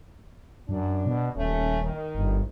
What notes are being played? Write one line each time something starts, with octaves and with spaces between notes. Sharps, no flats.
F#2 D4
B2
D#1 A3 C#4
D#3
G1